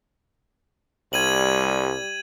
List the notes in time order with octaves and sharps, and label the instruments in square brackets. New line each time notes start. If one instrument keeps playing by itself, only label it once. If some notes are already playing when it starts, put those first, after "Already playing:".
[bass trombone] C2 [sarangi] G3 [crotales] G#6 D#7 F#7